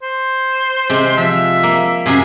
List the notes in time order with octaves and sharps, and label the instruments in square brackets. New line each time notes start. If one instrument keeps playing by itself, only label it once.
[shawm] C5
[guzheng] C3 G#3
[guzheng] F3 [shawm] E5
[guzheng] A#3
[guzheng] F#2 C3 [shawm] G#4